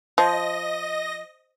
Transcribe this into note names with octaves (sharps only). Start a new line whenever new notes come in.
F3 D#5 A#6